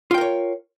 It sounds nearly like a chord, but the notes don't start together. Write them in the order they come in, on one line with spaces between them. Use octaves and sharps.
F4 G5 A#4 C#5